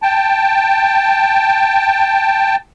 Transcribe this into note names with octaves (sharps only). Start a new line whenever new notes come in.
G5 A5